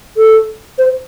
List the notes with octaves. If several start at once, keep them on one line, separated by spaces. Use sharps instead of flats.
A4
C5